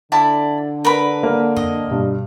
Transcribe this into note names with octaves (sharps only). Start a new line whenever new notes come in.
D3 E4 D5 A5
A#4 B4 B5
A#3
F2 D#5
G2 B2